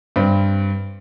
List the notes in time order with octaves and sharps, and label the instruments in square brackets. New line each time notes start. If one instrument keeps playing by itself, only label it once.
[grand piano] G2 C4